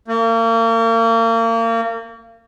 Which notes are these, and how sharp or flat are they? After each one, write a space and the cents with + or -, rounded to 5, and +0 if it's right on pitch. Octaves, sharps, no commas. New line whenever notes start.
A#3 -35